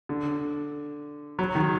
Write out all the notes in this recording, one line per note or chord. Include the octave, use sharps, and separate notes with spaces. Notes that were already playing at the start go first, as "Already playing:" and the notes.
D3
F#3
D#3